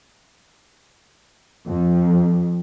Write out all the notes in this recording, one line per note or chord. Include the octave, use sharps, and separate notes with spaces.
F2